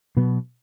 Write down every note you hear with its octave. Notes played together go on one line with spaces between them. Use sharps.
B2 F#3 B3